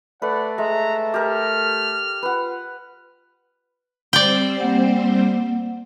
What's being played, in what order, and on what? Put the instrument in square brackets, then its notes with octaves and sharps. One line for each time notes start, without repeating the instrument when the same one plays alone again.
[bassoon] A3 [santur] B4 [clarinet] D5 [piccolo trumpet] F#5
[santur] G#3 [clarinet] E5 [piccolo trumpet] A#5
[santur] G4 A#4 [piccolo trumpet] F6
[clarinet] F4 [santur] B4 F#5
[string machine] G3 C4 C5 [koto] D5 G5
[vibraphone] A#3 F#5